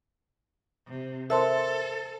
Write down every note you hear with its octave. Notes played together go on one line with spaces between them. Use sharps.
C3
A4 A#4 C5 E5 A5 C6